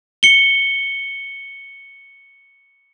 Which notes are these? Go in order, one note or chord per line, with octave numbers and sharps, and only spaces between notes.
C#7 G7